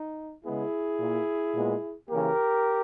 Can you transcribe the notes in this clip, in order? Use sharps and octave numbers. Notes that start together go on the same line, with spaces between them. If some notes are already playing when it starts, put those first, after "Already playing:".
Already playing: D#4
C#3 G#3 B3 E4 G#4
A#2 A#3
A#2 G#3 B3
C#3 E3 A#3 G4 A#4